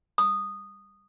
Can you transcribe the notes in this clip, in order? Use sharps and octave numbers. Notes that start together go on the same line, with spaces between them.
D#6